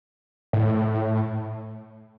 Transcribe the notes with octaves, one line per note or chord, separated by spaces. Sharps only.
A2